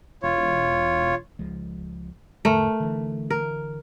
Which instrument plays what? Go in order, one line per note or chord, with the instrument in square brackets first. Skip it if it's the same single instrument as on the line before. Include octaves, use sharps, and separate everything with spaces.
[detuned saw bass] E1 [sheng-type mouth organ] F4 C#5
[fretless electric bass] C#2 F3 G#3
[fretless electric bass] E2 G#2 D3 [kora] A3 A#4
[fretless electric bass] D3 E3
[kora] A#4